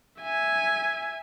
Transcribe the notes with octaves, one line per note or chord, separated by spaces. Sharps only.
E5 G#5